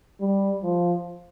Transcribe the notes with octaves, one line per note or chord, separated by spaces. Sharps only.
G3
F3